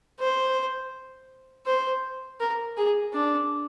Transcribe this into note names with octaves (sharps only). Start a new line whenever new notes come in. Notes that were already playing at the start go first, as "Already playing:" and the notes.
C5
C5
A#4
G#4
D4